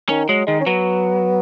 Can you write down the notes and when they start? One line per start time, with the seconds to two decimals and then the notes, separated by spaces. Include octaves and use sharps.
0.09 D#3 C#4
0.29 F#3 G#3
0.47 D#3 G#3
0.61 C#4
0.66 F#3 B3